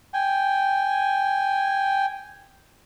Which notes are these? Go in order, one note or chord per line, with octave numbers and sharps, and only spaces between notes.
G5 G#5